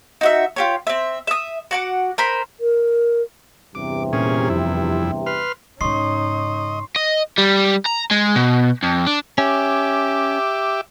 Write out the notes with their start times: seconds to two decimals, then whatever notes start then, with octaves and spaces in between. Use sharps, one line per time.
0.21 D#4 F#4 E5
0.56 F4 G4 C#5
0.87 C4 E5
1.27 E5 D#6
1.71 F#4 F#5 D6
2.18 A#4 C5 B5
2.60 A#4
3.75 E2 G2 C3 D6
4.13 A#2 C#4 G#4
4.50 F2 E4
5.26 B4 C6 F6
5.81 G#2 C#3 C#4 D#4 D#5 C6 C#6 C7
6.96 D#5
7.38 G3
7.86 A#5
8.11 G#3
8.36 B2
8.83 F2
9.07 D4
9.38 C#4 G4 E5 D6